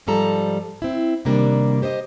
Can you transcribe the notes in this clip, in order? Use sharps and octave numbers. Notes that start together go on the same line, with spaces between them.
G#2 F3 G3 A4 A#5
C4 E4
C3 D#3 G3 A#3 D4
G4 C5 C#5 D#5